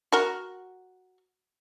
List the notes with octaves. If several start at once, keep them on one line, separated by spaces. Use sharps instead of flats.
F#4 A#4